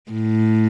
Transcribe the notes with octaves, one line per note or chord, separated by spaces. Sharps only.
A2